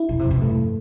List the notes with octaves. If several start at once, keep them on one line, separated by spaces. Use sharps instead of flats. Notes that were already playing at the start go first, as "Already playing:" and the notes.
Already playing: E4
F2 B2
C3
F2
B2
G2 A3